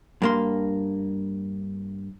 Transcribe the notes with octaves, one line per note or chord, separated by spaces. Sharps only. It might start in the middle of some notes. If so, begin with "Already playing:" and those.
G2 A#3 C6